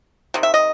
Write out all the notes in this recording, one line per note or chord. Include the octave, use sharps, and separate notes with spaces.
C3 D#3
E5
D#5